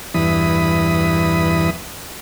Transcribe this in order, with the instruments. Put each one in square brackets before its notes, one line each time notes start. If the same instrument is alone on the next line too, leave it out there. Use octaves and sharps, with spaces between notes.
[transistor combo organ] E2 G2 E3 B5 D#6